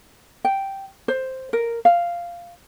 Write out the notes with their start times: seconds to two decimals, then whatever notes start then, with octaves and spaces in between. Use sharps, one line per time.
0.45 G5
1.08 C5
1.53 A#4
1.85 F5